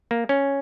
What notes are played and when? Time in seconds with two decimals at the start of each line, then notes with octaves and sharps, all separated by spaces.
0.11 A#3
0.29 C#4